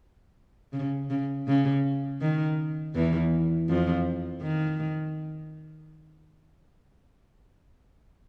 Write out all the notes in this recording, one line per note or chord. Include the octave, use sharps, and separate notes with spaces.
C#3
C#3
C#3
D#3
E2 E3
F2 F3
D#3